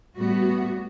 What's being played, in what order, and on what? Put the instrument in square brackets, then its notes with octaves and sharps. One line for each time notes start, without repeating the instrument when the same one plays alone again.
[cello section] A2 G3 B3 F#4